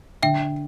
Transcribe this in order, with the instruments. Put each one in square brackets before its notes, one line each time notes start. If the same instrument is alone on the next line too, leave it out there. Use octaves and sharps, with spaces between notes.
[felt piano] D3 [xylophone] E5 G5